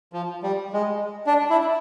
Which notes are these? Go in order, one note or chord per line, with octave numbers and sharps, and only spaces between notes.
F3
G3
G#3
D4
E4